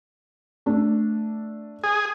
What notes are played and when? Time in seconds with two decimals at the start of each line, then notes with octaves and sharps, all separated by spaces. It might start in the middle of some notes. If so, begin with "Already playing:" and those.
0.66 A3 D4
1.84 G#4